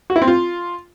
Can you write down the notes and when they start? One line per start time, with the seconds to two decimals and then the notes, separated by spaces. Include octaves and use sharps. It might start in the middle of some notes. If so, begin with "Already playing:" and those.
0.10 F#4
0.16 E4
0.22 C4
0.28 F4